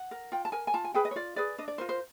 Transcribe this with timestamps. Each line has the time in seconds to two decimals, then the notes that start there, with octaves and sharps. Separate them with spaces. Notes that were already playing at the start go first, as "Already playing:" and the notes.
Already playing: F#5
0.11 A#4
0.32 F4 G5
0.45 A5
0.52 A#4 G#5
0.67 G#5
0.74 F4 A5
0.84 G#5
0.94 G#4 B4 G5
1.05 D#5
1.11 C#5
1.16 F4 D5
1.36 G#4 B4 D5
1.58 D4 D#5
1.68 D5
1.78 F4 A#4 C5
1.89 C5